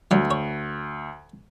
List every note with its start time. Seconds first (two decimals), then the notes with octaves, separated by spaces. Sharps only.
0.11 D2 F#3 G3
0.31 C#5